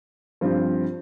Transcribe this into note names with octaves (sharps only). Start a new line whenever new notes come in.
G2 F3 C4 F4 C5